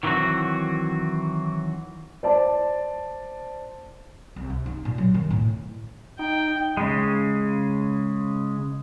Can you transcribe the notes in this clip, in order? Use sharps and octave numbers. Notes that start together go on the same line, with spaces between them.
D#3 E3 F#3 C4 F#4
C5 D5 A5
C2
C3
D#4
A#2
F#3
D#3
A2
D#4 G5
C#3 G#3